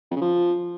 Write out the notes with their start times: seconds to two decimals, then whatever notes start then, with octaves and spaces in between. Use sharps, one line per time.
0.11 F2
0.16 C#3
0.21 F3